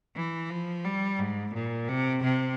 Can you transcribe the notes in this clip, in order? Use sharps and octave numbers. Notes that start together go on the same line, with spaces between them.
E3
F3
G3
G#2
A#2
C3
C3